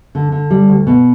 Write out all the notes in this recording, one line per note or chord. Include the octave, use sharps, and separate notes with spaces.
D3
D3
G3
D2
B2